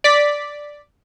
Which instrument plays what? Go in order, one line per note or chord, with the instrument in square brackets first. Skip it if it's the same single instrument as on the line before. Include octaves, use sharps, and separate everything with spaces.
[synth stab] D5 B6